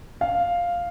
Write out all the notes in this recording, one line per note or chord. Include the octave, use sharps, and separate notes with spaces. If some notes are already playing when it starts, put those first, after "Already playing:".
F5